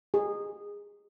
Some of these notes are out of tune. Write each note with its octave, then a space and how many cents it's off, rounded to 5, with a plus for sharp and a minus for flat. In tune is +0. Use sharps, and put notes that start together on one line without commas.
G#4 -20